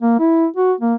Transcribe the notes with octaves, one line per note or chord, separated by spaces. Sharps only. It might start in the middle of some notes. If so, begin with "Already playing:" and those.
A#3
E4
F#4
A#3